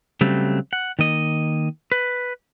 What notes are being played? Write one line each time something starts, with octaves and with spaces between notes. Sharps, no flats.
C#3 F#3 G3 A3 C4
F#5
D#3 A#3 D#5
B4